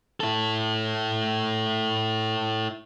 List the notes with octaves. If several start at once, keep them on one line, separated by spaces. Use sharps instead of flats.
E4 A4